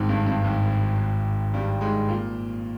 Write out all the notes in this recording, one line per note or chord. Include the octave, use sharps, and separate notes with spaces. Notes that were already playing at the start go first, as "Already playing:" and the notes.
Already playing: G#1 G#2
G2
G2
G#1 G#2
G2 G3
G#2 G#3
A#2 A#3